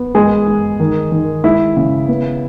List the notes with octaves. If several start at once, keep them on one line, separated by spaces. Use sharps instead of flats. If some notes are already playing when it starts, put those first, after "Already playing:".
Already playing: B3
G#3 G#4
G#3
D#3
D#3
G#3 E4
C#3
B3